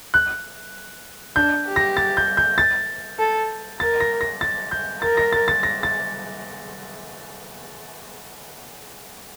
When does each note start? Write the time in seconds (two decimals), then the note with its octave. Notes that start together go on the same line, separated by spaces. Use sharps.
0.14 F#6
1.36 D4 G6
1.67 G4
1.76 A#6
1.97 A6
2.17 G6
2.37 G6
2.58 A6
3.19 A4
3.80 A#4 A6
4.00 A#6
4.21 A#6
4.41 A6
4.71 G6
5.02 A#4 A6
5.17 A#6
5.33 A6
5.48 A6
5.63 A#6
5.83 A6